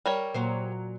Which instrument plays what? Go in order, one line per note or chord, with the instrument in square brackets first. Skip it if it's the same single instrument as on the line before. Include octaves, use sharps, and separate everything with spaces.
[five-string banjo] G3 A#4 C#5
[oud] A#2 F#3 C5